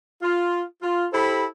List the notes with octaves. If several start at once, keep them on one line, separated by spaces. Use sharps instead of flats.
F4
F4
E4 G4 A4 C5 B5